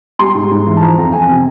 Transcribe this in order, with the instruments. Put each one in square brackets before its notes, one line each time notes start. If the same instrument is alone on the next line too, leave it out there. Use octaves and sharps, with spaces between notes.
[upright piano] G3 C6
G#2
G#2
E3
A5
F3 A#5
F2 A#5
F2 G#5
C3